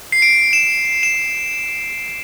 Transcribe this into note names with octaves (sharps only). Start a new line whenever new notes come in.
C7
D7
E7
E7